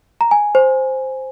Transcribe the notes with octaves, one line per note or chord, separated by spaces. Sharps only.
A#5
G#5
C5